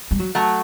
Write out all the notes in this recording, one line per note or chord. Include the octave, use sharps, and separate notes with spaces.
G3
F#3
F#3 A3